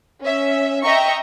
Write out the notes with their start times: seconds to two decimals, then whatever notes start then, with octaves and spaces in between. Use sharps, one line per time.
0.23 C#4 E5
0.83 D#5 E5 G5 A#5 C#6